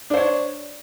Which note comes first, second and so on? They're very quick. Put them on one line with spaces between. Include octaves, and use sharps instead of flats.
D4 C5 C#5